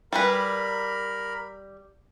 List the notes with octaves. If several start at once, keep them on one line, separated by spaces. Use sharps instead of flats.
G3 G#4 A#4 B4 B5